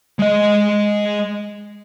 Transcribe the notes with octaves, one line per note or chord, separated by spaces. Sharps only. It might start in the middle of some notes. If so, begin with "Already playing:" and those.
G#3 D#5